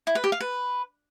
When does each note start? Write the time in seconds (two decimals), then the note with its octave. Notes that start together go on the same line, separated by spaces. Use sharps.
0.07 E4
0.15 B4
0.24 G4
0.32 F5
0.41 B4